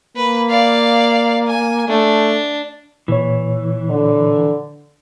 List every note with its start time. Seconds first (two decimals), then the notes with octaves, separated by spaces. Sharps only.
0.16 A#3 B4
0.49 D5 F5
1.47 G#5
1.88 A3 D4
3.08 A#2 E3 C#5
3.90 D3